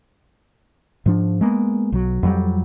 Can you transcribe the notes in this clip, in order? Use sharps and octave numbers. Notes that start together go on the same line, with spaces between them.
G#2 F3 D4
G#3 A#3 B3
B1 F#3
F2 F#3 G3